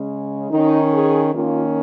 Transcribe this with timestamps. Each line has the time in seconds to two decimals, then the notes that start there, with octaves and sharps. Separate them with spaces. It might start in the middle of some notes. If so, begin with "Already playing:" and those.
Already playing: C#3 G#3 C#4
0.51 D#3 C#4 D#4
0.92 G#4
1.33 D#3 A#3 C#4 F4